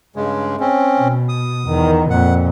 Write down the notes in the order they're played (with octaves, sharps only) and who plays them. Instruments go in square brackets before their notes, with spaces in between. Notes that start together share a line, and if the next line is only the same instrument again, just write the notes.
[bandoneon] G2 C#3 G#3
C4 C#4
[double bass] B2
[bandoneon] D#6
[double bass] E2 D#3
[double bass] F2 A#2 [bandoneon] F#5